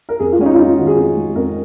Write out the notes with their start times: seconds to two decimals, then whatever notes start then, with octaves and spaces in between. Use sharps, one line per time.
0.09 A#4
0.20 F2 G#4
0.32 F4
0.39 G#3 C#4
0.46 D#4
0.54 F4
0.58 F2 D#4
0.77 D#3 F#4
0.87 G#4
0.97 F2
1.16 G#3
1.35 F2 A#4